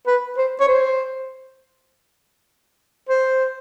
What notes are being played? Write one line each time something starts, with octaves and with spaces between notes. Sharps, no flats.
B4
C5
C#5
C5
C5